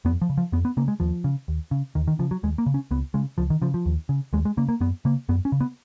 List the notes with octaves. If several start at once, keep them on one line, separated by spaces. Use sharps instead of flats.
F2 B3
F3
C#3
F3
F2 B3
B3
C#3 A#3
G#3
D#2 F3
C#3
D#2
C#3
D#2 D#3
D#3
C#3 F3
F#3
D#2 G#3
A#3
C#3
C#4
C#2 B3
C#3 G#3
C#2 F3
D#3
C#3 F3
F3
D#2
C#3
D#2 G#3
G#3
C#3 A#3
A#3
F#2 B3
C#3 A#3
F#2 B3
C#4
C#3
B3